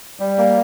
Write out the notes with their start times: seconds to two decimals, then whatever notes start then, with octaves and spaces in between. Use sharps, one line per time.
0.20 G3
0.38 A#3